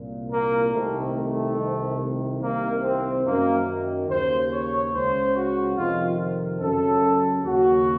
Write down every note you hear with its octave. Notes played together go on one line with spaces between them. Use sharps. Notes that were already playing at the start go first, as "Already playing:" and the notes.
Already playing: C2 A#2
A#3
C2 C3 D#3 A3
A3
C2 C3 D#3
C2 C3 D#3 A#3
C4
F#2 D#3 A#3
D#2 C#3 C5
C#5
C#2 C#3 C5
F#4
F2 C3 D#3 F4
F#2 C#3 A4
D#2 C#3 F#4